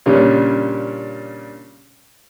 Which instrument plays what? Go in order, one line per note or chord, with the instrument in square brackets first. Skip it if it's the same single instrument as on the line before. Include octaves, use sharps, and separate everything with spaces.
[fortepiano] A#2 C#3 G3 C#4 D4